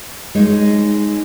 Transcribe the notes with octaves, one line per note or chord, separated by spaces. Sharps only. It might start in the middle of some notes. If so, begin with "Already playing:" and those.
G#3 D#4 C#5